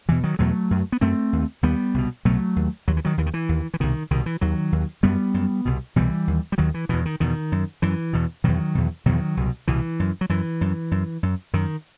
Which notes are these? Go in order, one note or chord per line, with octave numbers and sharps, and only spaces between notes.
E2 B2 E3
D#3 F#3
E2 B2 F#3 A3
F#2
B3
F#2 A3 C4
D#2
D#2 G3 B3
C2 B2
C2 B2 F#3 A3
D#2
D#2 F#3
E3
D#3 F#3
D#2 E3
D#3
E3
D#2
E3
C2 B2 D#3
C2 B2 D#3
E3
D#2 D#3 F#3
D#2
F#2 G3 B3
F#2
C2 B2
C2 B2 E3 G3
D#2
G3
D#2 D#3 F#3
E3
E2 B2 E3
D#3
E2 B2 D#3
F#2
F#2 E3
E2 B2
E2 B2 D#3 F#3
E2 B2
E2 B2 D#3 F#3
C2 B2
C2 B2 E3
F#2
F#3
F#2 E3
F#2
F#2
F#2
F#2 D#3